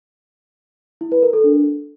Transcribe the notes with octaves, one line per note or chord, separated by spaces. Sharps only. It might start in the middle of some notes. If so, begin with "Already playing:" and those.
E4
B4
A#4
A4
D4